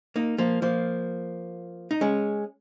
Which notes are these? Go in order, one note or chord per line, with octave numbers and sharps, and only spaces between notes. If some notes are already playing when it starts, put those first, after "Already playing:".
A#3 D#4
F3 A#3
F3 A#3
D#4
G#3 C#4